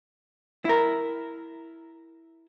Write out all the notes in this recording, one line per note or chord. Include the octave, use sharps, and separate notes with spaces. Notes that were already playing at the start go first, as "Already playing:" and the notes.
E4 A#4